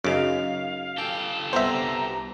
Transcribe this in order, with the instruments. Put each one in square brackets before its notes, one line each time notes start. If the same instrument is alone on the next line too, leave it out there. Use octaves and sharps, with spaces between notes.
[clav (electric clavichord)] F#2 C#3 [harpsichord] D#4 D6 [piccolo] F5
[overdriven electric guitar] G4 A4 [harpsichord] G5
[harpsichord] C2 B3 B4 [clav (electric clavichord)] C5 E5 [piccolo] A#5